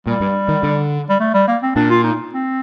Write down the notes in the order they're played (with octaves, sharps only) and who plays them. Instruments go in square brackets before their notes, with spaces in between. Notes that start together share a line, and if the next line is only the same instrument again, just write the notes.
[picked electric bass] A#2 [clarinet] G3
[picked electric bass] G2
D#3
D3
[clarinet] G3
A3
G3
A#3
C4
[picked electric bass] A#2 [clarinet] D4
[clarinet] F4
D#4
C4